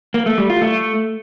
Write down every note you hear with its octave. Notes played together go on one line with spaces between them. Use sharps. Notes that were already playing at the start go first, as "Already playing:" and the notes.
A#3
A3
G3
F4
A3